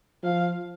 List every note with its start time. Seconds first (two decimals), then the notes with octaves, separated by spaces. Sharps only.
0.24 F3 F5